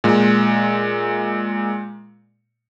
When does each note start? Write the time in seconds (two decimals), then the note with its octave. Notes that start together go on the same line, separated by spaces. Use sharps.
0.04 A#2 G#3